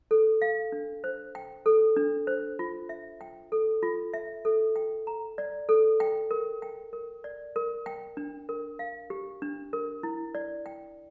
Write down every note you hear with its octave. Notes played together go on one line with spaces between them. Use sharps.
A4
F5
D4
C5
G5
A4
D4
C5
F4
E5
G5
A4
F4
E5
A4
G5
A#5
D5
A4
G5
A#4
G5
A#4
D5
A#4
G5
D4
A#4
F5
G4
D4
A#4
E4
D5
G5